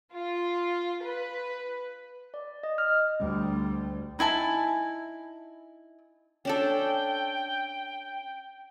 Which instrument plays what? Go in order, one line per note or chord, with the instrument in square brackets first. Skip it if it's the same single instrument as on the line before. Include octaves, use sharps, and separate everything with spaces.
[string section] F4
B4
[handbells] D5
D#5
F6
[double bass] D2 G3
[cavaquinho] D#4 E4 G#5 A5
[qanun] C#4 D4 A4 [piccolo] G5